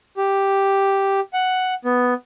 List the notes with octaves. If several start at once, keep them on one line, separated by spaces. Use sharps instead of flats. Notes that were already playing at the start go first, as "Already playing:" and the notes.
G4
F#5
B3